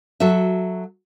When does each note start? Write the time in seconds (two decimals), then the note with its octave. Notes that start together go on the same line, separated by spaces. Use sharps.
0.20 F#3 F#4 A4 E5